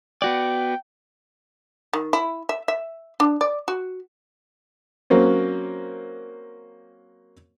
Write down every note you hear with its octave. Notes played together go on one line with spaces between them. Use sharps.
B3 F#4 D5 G5
D#3
E4
E5
E5
D4
D5
F#4
F#3 A#3 C4 C#4